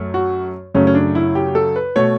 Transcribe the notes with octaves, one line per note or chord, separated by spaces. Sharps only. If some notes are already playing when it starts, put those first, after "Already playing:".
Already playing: F#2 A3
F#4
F#2 C#3 F#3 A3 C#4
C#4
D4
E4
G4
A4
B4
B2 A3 C#5